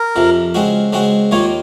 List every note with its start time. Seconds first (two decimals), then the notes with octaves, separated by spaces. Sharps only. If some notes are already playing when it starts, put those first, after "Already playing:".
Already playing: A#4
0.16 F2 C3 F3
0.54 C#3 G#3 C4 F#4
0.93 C#3 G#3 C4 F#4
1.31 D#2 D#3 A#3 F4 C#5